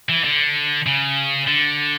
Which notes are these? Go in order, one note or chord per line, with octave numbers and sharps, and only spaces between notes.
E3
D3
C#3
D3